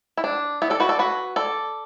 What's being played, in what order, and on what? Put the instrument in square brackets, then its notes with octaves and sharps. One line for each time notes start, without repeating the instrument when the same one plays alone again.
[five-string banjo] E4
D4
B3 E4
A4 D5
F#4 B4
A4 D5
F#4 B4
A4 D5